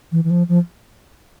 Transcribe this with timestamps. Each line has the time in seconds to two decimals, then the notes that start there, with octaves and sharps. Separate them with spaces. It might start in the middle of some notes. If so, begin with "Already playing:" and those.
0.12 E3
0.24 E3
0.30 F3
0.49 F3